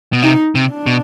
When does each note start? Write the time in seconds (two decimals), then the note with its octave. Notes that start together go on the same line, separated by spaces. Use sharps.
0.13 B2
0.22 C3 D#4
0.55 C3
0.70 D4
0.86 B2